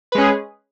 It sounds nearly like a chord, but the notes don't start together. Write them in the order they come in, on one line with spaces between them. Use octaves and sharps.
B4 G#3 C#4 G#4